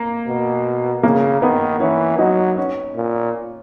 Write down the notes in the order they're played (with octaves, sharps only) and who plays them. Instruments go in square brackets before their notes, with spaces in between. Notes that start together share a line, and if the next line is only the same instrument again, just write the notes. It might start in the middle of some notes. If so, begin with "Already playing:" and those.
Already playing: [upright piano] A#3
[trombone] B2
[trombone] C#3 [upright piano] A#3
[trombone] D#3 [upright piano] B3
[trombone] E3 [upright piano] C#4
[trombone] F#3 [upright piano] D#4
[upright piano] C#4
[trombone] A#2